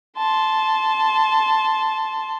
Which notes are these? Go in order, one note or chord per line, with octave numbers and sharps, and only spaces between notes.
A5 C6